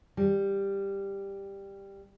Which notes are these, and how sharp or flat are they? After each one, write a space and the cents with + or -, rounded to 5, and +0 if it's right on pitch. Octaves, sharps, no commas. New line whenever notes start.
G3 +10